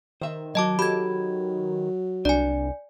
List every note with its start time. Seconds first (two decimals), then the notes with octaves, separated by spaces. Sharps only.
0.21 D#3 C5 E5
0.55 F#3 F#4 D#5 A5 D6
0.79 F#3 G4 A4 B5 G#6
2.25 C2 D4 D5 G#5